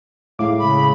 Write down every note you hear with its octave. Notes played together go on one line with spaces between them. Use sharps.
A2 G#3 E4 F5 D6
C#3 B5